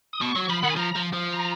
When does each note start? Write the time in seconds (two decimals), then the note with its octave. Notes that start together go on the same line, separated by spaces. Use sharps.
0.13 D#6
0.21 B2 C#6
0.36 F#3
0.45 C#6
0.49 F3 B5
0.63 D#3 F#5
0.70 G#5
0.77 F3 A#5
0.96 F3
1.13 F3
1.33 A#5